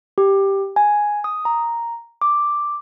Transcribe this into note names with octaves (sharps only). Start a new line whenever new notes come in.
G4
G#5
D#6
A#5
D6